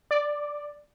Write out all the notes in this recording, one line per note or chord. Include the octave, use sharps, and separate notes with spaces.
D5